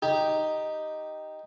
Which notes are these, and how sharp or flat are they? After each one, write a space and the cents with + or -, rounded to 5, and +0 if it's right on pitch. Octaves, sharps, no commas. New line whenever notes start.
D#4 +0 G4 +0